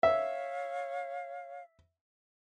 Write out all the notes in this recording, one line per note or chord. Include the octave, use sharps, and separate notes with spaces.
C#5 E5 F5